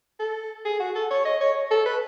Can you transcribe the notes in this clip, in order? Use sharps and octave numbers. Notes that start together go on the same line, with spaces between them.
A4
G#4
F#4
A4
C#5
D#5
C#5
A4
B4